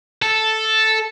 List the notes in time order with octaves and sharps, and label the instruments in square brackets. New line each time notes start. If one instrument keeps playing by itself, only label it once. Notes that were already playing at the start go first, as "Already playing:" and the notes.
[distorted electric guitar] A4